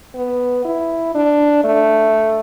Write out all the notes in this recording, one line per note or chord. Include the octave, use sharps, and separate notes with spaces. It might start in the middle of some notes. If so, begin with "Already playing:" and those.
B3
E4
D4
A3